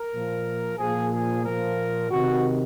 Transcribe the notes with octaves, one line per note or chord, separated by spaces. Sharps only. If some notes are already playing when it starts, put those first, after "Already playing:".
Already playing: A#4
A#2 F3
A#2 F3 G#4
G#4
A#2 F3 A#4
C3 D#3 F#4